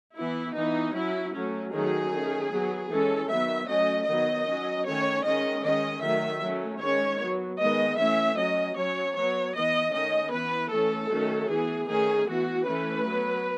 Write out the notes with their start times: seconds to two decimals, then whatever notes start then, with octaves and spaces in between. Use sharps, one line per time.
0.16 E3 B3 E4
0.55 E3 B3 D#4
0.94 F#3 C#4 E4
1.33 F#3 A3 C#4
1.72 D#3 F#3 A3 C#4 G#4
2.11 D#3 A3 C#4
2.51 F#3 B3
2.90 E3 G#3 C#4 A4
3.28 D#3 F#3 B3 E5
3.67 F#3 A3 C#4 D#5
4.06 D#3 F#3 B3 D#5
4.46 F#3 C#4
4.85 D#3 A3 C#4 C#5
5.23 D#3 G#3 C#4 D#5
5.63 D#3 G#3 C#4 D#5
6.01 D#3 F#3 A3 E5
6.41 F#3 A3 C#4
6.80 D#3 G#3 C#4 C#5
7.19 F#3 B3
7.58 D#3 G#3 B3 D#5
7.97 E3 A3 C#4 E5
8.37 F#3 C#4 D#5
8.76 F#3 C#4 C#5
9.14 F#3 B3 C#5
9.54 E3 B3 D#5
9.92 D#3 A3 C#4 D#5
10.31 E3 B3 B4
10.71 E3 A3 C#4 A4
11.09 D#3 F#3 A3 C#4
11.48 E3 B3 G#4
11.88 D#3 A3 C#4 G#4
12.27 E3 B3 F#4
12.66 E3 A3 C#4 B4
13.06 F#3 B3